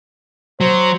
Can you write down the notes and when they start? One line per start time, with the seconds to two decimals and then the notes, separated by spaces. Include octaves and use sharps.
0.61 F#3 C5